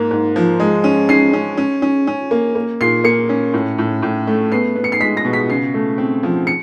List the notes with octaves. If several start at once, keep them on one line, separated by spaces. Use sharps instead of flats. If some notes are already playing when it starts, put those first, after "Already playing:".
Already playing: G#2 A#3
G#2
F3
G#3
C#4
C#4 C7
C#4
C#4
C#4
C#4
A#3
A#3
A#2 C7
A#3 C#7
C#4
A2
A2
A2
A3
B3 C7
B3
C#7
C7
G#3 B6
A#6
B2
B6
C#3 C7
A3
C4
F3
C#7